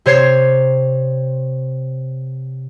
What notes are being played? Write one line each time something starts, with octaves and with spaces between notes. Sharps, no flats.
C3 C5 C#5 G#6 C7